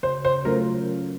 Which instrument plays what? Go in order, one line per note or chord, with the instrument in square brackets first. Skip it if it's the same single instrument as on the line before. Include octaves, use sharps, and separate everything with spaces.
[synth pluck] C#3 [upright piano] C5
[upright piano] C5
[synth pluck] F#3 A3 C#4 F4 [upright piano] A#4